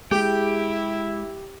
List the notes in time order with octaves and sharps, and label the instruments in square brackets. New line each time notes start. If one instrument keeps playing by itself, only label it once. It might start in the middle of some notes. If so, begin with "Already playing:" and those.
[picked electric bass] G#3 [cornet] E4 [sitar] G4 [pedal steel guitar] G5